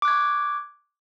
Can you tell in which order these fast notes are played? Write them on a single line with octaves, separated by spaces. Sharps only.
D6 F#6 G#6 C#6